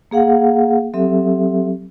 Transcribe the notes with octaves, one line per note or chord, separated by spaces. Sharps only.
A#3 G#4 F5 F#5
F#3 C4 G4 A4 E5